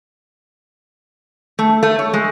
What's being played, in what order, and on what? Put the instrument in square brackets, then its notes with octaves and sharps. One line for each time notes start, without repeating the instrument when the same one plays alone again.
[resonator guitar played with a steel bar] A3
A3
C#5
G#3